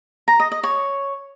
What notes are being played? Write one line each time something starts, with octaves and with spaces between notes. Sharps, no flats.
A#5
D#5
D#5
C#5